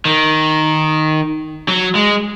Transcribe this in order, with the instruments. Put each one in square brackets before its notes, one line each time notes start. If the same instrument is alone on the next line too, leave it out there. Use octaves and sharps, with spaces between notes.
[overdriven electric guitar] D#3
F#3
G#3